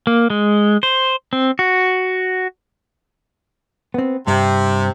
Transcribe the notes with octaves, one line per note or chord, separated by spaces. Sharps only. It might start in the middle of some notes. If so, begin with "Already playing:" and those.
A#3
G#3
C5
C4
F#4
B3 C4
G2 C3